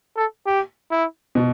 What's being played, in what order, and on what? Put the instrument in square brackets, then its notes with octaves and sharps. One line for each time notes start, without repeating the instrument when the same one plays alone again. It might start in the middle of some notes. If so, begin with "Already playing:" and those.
[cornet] A4
G4
E4
[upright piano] B2